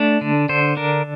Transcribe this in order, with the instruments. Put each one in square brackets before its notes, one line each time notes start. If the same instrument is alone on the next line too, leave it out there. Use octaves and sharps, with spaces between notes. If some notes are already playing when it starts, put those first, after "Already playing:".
Already playing: [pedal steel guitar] A3 D4
D3
D3 C5
D4 A#4